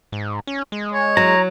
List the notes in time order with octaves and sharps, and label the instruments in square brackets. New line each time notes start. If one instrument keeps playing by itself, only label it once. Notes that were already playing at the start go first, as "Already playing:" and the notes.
[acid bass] G#2
C#4
G#3
[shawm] C#5
[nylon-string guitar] F#3 [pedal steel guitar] A#5